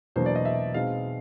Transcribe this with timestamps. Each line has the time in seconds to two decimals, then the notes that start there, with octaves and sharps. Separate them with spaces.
0.16 E2 B2 F#3 A#3 D4 C5
0.26 D5
0.35 D#5
0.45 E5
0.74 B2 G#3 C4 D#4 F5